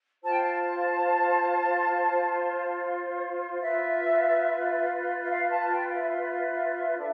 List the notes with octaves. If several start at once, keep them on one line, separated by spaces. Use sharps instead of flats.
F4 C5 A5
G5
A5
F4 B4 E5
E5
F5
A5
G5
E5
E5
D4 A4